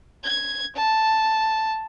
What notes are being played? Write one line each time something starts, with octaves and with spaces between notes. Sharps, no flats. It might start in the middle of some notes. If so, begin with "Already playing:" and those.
G#6
A5